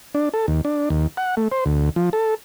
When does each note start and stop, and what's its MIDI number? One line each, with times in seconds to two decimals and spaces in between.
0.15 0.29 62
0.34 0.46 69
0.48 0.61 39
0.65 0.89 62
0.90 1.07 39
1.17 1.35 78
1.37 1.48 57
1.52 1.64 72
1.66 1.90 38
1.96 2.10 53
2.13 2.35 69